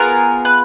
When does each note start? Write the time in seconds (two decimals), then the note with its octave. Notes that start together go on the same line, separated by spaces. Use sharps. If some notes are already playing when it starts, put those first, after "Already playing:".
Already playing: B3 F4 G#4 A#4
0.45 B4